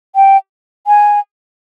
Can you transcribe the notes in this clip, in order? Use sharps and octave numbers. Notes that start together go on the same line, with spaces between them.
G5
G#5